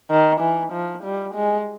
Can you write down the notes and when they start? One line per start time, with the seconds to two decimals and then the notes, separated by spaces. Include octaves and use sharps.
0.11 D#3
0.41 E3
0.73 F3
1.04 G3
1.34 G#3